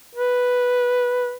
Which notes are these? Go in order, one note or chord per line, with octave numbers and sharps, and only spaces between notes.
B4